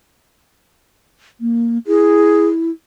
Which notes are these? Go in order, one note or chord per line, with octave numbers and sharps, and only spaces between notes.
A#3
E4 G#4